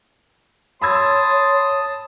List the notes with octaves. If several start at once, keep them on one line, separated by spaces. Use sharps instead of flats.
C#5 A5 B5 C6 D#6 E6 G#6